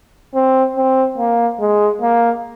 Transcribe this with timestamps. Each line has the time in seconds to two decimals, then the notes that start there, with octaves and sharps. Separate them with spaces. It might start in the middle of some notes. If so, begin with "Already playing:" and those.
0.34 C4
0.76 C4
1.18 A#3
1.60 G#3
2.02 A#3